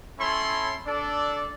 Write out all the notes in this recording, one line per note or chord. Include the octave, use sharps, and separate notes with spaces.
C#4 E4 A4 C#5 B5 C6
D4 A4 D5